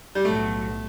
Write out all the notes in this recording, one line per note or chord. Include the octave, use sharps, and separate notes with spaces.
G3
B1 A2 F#3 A3